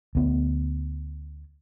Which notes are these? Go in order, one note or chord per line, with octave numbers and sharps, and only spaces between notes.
D2 B3